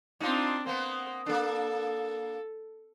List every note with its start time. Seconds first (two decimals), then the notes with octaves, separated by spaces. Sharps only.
0.20 C4 D4 D#4 F4
0.67 A#3 B3 C5
1.26 A#3 D4 A4